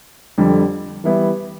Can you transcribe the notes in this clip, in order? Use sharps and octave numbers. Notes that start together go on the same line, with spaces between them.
F2 D3 G3
E3 G3 B3 E4